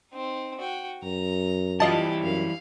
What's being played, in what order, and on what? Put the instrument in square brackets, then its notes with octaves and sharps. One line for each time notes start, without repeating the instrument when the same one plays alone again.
[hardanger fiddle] C4 D#4
F#4 G5
[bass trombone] F#2 [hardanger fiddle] A#5
[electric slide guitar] E3 G3 E4 [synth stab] F4 D#5 A5 [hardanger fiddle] G4 D6
[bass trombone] F#2 [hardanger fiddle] F5